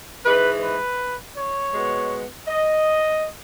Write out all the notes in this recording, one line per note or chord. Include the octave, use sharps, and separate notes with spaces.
G#2 E3 G#3 B4
B4
C#5
B2 G#3 B3
D#5